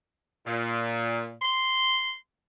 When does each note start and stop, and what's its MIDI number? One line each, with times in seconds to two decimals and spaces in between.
0.46 1.32 46
1.42 2.12 84